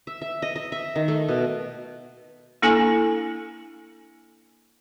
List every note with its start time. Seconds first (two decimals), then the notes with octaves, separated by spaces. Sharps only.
0.07 E5
0.22 E5
0.42 D#5
0.56 D#5
0.72 E5
0.96 D#3
1.08 A3
1.29 B2
2.62 A#3 D4 E4 A4 G#5